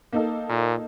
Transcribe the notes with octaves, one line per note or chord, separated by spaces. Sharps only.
A#3 D#4 A4
A#2